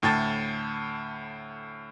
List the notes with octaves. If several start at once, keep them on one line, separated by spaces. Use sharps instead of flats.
D2 A2 G5 A5 A6